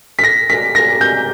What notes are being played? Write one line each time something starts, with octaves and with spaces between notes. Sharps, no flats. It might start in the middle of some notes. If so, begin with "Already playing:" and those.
B6
A#6
B6
A#6
G6